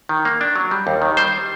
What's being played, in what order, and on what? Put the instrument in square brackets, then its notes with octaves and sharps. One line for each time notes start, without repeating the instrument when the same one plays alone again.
[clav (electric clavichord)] D#3
A#3
D4
F#3
G3
D#2
D#3
G3 C5